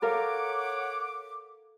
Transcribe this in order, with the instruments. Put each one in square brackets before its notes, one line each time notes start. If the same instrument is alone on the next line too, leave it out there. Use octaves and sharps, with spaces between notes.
[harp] A4 A#4 F5 [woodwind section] C#5 F#5 D6